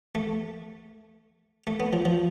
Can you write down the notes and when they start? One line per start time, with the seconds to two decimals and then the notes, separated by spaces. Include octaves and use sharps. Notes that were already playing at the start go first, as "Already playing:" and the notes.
0.15 A3
1.67 A3
1.80 B3
1.93 F3
2.05 F3